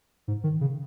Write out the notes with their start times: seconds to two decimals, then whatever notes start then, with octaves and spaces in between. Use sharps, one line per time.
0.28 G#2
0.44 D#3
0.61 C#3